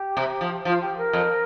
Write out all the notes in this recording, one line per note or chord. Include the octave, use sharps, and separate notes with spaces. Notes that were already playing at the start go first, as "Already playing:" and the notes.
Already playing: G4
C3
F3
F3 F4
G4
A#4
F2